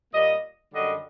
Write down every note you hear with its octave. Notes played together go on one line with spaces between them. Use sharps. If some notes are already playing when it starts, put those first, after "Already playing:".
A#2 G3 A#3 D#5
F#2 D3 G3 D#5